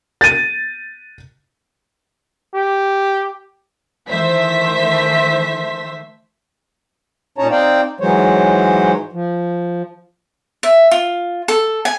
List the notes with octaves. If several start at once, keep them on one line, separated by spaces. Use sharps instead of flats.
A6 D#7
G4
D#3 E3 A3 C5 E5 B6
A#2 C#4 D#4 C#5 A5 A#5
C4 D#4 C5 D5 F5 G5
G#2 E3 F#3 G#3 C5 C#5
F3
E5
F4
A4
G#5